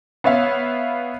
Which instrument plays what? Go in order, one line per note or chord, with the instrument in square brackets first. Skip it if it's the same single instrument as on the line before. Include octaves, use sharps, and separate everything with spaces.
[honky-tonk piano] B3 C#5 E5 F5